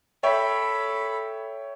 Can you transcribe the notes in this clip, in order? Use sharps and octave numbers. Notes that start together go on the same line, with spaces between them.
A4 C#5 E5 G5 B5